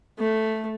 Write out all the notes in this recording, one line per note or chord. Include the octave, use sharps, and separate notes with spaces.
A3